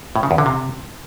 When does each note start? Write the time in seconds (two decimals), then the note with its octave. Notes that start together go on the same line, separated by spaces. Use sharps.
0.16 A2
0.23 C#3
0.31 E2
0.38 D3
0.46 C3